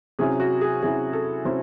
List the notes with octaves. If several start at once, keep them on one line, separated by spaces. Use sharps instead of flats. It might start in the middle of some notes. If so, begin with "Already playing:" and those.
C3 F#3 C#4 E4 G#4
F#4
G#4
C3 F#3 C#4 E4 G#4
A4
C3 F#3 C#4 E4 C5